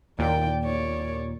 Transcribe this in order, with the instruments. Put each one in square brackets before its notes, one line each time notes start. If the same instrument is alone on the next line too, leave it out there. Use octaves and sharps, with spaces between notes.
[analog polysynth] D#2 A#2 [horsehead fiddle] D5 G5
[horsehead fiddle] C#5 D5